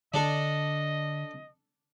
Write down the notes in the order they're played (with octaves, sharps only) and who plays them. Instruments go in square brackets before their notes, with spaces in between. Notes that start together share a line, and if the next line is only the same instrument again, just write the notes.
[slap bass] D3 [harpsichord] D4 A4 [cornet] D#5